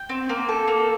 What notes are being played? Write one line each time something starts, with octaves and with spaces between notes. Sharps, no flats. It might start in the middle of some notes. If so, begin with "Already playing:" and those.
Already playing: G5
C4
A#3
A4
A#3